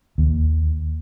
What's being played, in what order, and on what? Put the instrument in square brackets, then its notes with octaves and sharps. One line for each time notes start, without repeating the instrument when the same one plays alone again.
[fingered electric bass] D#2